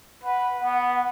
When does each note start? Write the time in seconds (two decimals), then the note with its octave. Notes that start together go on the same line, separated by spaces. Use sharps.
0.24 B4 F#5
0.62 B3